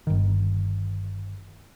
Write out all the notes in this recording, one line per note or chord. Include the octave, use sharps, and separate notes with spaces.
G1 D#3